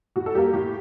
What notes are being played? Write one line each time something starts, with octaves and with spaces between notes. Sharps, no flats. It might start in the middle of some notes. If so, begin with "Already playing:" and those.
A2 F#4
A4
G3 A#3 G4
A2 G4